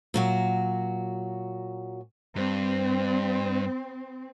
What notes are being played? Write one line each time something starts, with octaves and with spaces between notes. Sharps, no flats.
A#2 F#3 F#4
G2 C4